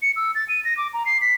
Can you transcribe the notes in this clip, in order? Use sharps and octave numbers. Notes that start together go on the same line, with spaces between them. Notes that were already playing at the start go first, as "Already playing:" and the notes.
C#7
E6
A6
D#7
A#6
D6
A#5
C7
B6